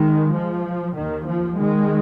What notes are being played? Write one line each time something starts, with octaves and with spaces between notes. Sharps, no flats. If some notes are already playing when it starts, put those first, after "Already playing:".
Already playing: D#3 G#3
F3
D#2 D#3
F3
D#3 G#3